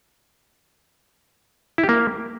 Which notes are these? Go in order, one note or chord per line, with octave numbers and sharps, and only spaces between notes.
E4
G4
A#3